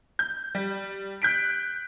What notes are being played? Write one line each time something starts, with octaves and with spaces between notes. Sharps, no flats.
G6
G3
F#6 G6 B6 D7